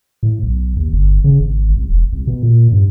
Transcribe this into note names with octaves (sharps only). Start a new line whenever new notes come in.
A2
B1
D#2
G1
C#3
G#1
C2
E1
C2
B2
A#2
G2